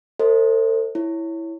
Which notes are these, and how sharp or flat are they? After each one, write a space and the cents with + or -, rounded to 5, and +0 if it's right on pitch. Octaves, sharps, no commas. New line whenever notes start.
A4 +40 C5 +5 D#5 +20
E4 +0 C#5 +0